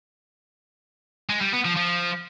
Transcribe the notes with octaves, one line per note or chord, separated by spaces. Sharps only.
G#3
G3
B3
F3
F3